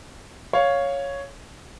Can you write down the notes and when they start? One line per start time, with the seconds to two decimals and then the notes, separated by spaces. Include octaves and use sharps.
0.53 C#5 F5